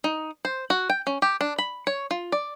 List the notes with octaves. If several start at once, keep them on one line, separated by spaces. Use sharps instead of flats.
D#4
C5
F#4
G5
C#4
G4
D4
B5
C#5
F4
D5